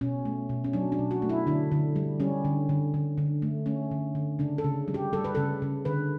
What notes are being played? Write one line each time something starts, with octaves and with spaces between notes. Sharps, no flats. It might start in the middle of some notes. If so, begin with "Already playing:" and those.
B2 C#4
A3
B2
C#4
F#3 D4
D4
B2
F#4
A3
E4
D3 D4
D3
G3
G3 C#4
D3
D3
D3
D3
A3
A3 C#4
D3
D3
C#3 D4
A4
C#3
G3
G4
G3 A4
B4
C#3 A4
C#3
D3 B4